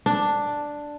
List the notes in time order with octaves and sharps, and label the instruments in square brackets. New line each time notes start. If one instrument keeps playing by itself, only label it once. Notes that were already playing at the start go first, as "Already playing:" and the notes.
[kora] D4